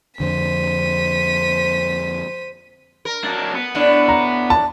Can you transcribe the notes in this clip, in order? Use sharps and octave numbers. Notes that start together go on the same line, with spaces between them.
F2 D3 C5 B6 D#7
A#4
F#3 D4
B3
A2 D4
A#5
A5